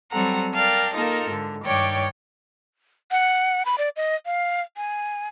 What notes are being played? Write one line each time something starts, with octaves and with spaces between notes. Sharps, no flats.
F#3 G3 C4 A4 F#5 A#5
A#4 D5 F5 G5 A5
A#3 D#4 F4 A4 A#4
G#2 D3
G2 D#3 C#5 D5 G5 D6
F#5
B5
D5
D#5
F5
G#5